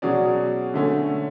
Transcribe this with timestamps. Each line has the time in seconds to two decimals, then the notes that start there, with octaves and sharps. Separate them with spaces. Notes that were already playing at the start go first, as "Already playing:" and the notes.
0.02 B2 F#3 C#4 G#4 D5
0.74 D3 A3 C#4